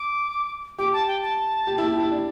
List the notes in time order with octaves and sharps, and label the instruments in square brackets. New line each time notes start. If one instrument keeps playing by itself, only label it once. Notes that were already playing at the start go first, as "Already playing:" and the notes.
Already playing: [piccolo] D6
[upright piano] G4 [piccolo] D6
[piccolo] A5
G5
A5
[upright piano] G4
E4
G4
E4
D4